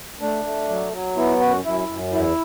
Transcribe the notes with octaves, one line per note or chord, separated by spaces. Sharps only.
A3 D4
A3
F#3
F#3
B3 E4
F#2 F#4
F#2 E4
F#2
E2 E4